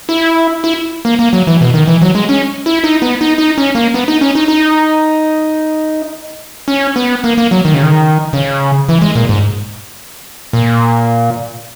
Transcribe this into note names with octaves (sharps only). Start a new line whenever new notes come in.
E4
E4
A#3
A#3
F#3
E3
B2
D#3
E3
F#3
G#3
C#4
E4
D#4
B3
D#4
D#4
C#4
A#3
B3
D#4
C#4
D#4
D#4
C#4
B3
A#3
A#3
F#3
D#3
C#3
D#3
C#3
E3
G#3
A#2
G#2
A#2